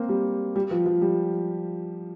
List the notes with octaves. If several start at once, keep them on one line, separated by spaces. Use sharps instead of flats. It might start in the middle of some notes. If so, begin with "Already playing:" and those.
Already playing: A#3 C4
G3
G3
F3
F3
G3